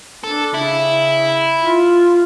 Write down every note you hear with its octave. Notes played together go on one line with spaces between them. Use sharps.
D4 A4
C#3 E4
F4